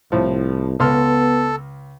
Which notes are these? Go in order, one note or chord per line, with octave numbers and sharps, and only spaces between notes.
C2 A2 F3
C#2 B3 A4 C6 F6